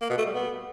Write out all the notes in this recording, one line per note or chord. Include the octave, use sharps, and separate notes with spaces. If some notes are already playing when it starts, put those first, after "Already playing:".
A#3
B2
A3
G3
B3